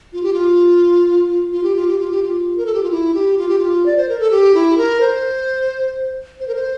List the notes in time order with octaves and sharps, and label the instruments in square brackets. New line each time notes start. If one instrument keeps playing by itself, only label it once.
[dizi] F4
G4
F4
F4
G4
F4
G4
F4
G4
F4
A#4
A4
G4
F4
E4
G4
F4
G4
F4
D5
C5
A#4
A4
G4
E4
A#4
C5
C5
A#4
C5